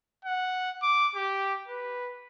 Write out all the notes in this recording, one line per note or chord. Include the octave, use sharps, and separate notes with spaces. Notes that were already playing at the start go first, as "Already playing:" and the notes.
F#5
D6
G4
B4